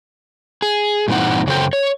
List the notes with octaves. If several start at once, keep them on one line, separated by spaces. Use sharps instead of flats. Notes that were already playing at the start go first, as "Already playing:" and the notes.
G#4
G2 A#2 E3 C4 D#4 F#5
F#2 C#3 F#3 A4 C5 G5
C#5